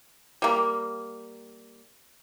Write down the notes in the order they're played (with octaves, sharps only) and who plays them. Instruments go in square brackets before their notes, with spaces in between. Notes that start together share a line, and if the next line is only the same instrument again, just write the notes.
[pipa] G3 A#3